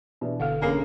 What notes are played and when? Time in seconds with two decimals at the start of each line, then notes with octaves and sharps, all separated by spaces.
0.21 B2 E3 D4
0.40 G1 D3 A4 F5 F#5
0.62 E1 A#3 C#4 D4 G#4 G#5 C7